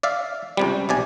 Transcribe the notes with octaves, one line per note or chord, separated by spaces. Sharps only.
D5 E5 F5
C#2 C3 G3
B1 C3 D5 G#5